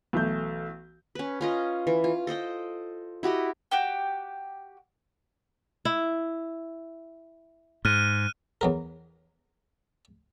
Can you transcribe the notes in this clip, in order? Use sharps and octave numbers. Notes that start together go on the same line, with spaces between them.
B1 E3 A3 G6
C#4 B4
C#4 F4 D#5
E3
F4
A4 C5 D#5 G5
E4 F#4 G4 D#5
F#4 G4 G5
E4
G#2 F6 F#6 D#7
E2 F#3 A#4